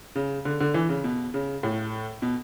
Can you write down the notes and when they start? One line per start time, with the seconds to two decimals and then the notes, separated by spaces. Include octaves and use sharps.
0.15 C#3
0.45 D3
0.60 D3
0.74 E3
0.89 C#3
1.04 B2
1.34 C#3
1.63 A2
2.22 B2